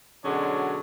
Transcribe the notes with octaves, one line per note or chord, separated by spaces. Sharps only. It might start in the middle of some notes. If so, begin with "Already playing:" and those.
B2 D3 F#3 G#3 C#4 D4